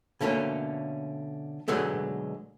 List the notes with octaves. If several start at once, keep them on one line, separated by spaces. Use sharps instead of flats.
B2 D3 A3 A#3 C#4
B2 D3 F#3 G#3 A3 B3